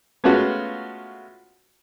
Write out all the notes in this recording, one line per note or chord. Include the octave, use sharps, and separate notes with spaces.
G#3 A3 B3 C#4 F4 F#4